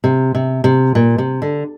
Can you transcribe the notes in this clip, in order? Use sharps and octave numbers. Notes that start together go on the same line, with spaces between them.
C3
C3
C3
A#2
C3
D3